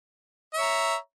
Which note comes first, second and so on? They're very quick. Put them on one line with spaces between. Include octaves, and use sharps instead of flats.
E5 C#5 A#5